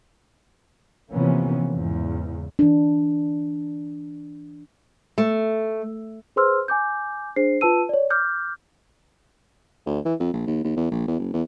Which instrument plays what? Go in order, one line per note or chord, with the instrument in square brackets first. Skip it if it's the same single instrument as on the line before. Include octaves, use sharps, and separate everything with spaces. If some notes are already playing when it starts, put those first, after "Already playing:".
[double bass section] C3 E3 F3 A#3 B3 C#4
E2 G#2 C#3
[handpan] E3 D4
[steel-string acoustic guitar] A3
[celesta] G#4 B4 C5 C6 E6 F6
G#5 D6 G6
D4 G#4 C5 C7
F4 B4 A5 E6 D#7
C#5 D5
D6 F6 G6
[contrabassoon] D2
E3
F2
A#1
D#2
D#2
E2
A#1
E2
F#1
E2